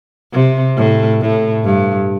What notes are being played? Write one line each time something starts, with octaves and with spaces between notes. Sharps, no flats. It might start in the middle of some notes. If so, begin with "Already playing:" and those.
C3
A2
A2
G2